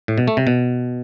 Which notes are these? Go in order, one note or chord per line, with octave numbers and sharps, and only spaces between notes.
A2
B2
A3
C3
B2